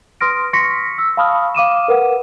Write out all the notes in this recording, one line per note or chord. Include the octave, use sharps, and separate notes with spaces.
B4 C6 D#6 F6 A#6 D7
C6 C#6 A#6 B6 C#7
E6
F5 A5 B5 C#6 D#6 F6
F5 D6 D#7 E7
A#4 B4 F#5